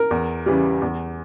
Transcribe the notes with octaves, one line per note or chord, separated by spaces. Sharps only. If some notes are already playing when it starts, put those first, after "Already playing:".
Already playing: A#4
E2
C#3 E3 G3
E2